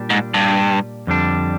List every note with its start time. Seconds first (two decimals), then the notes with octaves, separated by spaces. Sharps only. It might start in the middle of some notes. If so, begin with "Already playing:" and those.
Already playing: A#2 G3 D4
0.10 G#2
0.34 G2
1.07 F2 D3 G3 D4